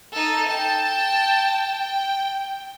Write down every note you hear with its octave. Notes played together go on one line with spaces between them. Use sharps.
D#4 A4
G5 A5
G5